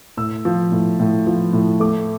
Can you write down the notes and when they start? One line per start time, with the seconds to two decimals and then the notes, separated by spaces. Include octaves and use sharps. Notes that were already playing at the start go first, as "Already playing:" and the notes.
0.17 A2 E6
0.45 F3
0.72 A2
1.00 A2
1.27 F3
1.53 A2
1.80 A3 D6